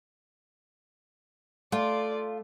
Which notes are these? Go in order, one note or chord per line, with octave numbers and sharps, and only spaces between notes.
A3 F4 D5